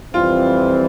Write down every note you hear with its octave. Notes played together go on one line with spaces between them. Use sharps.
F2 E3 G3 C4 F4